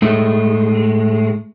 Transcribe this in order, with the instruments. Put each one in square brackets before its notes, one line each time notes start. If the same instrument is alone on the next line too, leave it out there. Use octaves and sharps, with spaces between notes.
[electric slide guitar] A2 G#3 A3